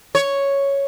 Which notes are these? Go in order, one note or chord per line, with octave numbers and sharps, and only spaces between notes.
C#5